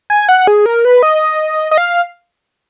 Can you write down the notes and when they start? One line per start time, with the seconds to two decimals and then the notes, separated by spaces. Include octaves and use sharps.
0.10 G#5
0.29 F#5
0.47 G#4
0.66 A#4
0.85 B4
1.03 D#5
1.71 D#5
1.78 F5